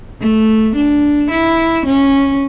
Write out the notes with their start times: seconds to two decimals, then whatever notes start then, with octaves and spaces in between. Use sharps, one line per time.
0.21 A3
0.76 D4
1.31 E4
1.86 C#4